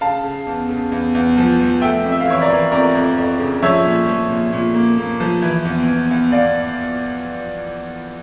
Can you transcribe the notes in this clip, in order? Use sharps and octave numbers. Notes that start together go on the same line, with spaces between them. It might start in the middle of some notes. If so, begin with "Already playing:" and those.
C#3 F5 A5
C#3
E2
C#3
E2
E2
F3
F3
A3 E5 G5
F2
E5
F5
E3 C#5 E5
A#4 D5
E3
F2 A#4 D5
F2
F2
C#3
F3 C#5 E5
A#2
F3
A#2
A#2
A#3
A#3
F3
E3
E2
E2
E2
E2 D5 F5